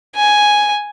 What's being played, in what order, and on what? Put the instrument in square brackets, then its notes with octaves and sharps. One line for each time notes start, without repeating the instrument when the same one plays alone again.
[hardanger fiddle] G#5